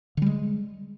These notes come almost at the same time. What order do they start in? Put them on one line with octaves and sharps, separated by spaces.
D3 G3 G#3